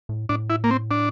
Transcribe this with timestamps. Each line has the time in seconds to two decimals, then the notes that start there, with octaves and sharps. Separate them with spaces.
0.09 A2
0.29 A2 D4
0.50 E4
0.64 A#3
0.71 C4
0.91 D4